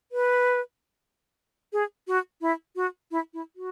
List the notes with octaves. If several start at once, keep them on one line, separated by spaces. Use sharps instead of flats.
B4
G#4
F#4
E4
F#4
E4
E4
F#4